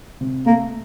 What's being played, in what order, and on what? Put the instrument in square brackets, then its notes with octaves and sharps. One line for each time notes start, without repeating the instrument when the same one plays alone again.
[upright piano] C3
[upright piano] A3 [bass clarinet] A#3